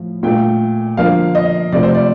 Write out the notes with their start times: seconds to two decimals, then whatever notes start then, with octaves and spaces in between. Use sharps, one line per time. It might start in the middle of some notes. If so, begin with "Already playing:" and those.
Already playing: A2 F3
0.23 A#2 A3 G5
0.97 D3 F3 A#3 F5
1.35 D#5
1.72 C3 F3 A3 D5
1.83 C5
1.95 D5